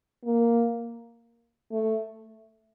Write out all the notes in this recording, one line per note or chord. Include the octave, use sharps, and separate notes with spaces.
A#3
A3